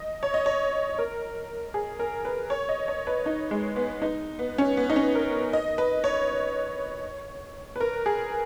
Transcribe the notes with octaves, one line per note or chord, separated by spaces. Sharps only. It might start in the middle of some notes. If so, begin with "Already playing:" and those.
Already playing: D#5
C#5
D#5
C#5
A#4
G#4
A#4
B4
C#5
D#5
C#5
B4
D#4
G#3
B3
D#4
B3
C#4
B3
D#4
C#4
A#4
D#5
B4
C#5
B4
A#4
G#4